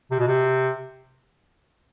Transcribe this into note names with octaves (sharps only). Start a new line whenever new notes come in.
C3
B2
C3